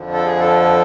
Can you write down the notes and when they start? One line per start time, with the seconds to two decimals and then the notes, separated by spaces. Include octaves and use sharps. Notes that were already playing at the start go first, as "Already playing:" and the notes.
Already playing: F2 D3 F3
0.13 A4
0.26 G#4
0.40 A4